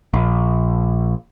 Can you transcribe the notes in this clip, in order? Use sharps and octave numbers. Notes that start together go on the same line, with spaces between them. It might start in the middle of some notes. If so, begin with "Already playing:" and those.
A#1